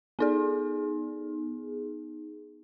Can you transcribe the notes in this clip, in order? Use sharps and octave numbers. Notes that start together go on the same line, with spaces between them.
B3 D#4 G#4